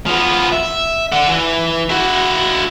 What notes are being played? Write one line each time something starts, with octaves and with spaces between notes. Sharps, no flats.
F3 B3
E5
D5 F#5
E3
E4 F#4